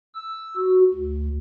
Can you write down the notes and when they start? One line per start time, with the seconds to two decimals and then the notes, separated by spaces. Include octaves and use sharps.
0.14 E6
0.57 F#4
0.94 D2